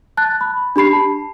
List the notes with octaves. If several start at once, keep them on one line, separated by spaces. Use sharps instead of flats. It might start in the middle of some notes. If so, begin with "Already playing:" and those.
A5 F#6 A6
B5
D4 G4 B5 C7
A5